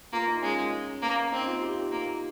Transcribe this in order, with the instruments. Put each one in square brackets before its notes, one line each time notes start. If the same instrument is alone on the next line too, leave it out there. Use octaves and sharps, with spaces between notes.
[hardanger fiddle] A#3 [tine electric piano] F4
[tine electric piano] D#4
[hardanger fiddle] G#3 [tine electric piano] C#4
[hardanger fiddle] A#3
[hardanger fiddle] C4 [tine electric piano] D#4
[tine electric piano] F4
G4
[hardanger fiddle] A#3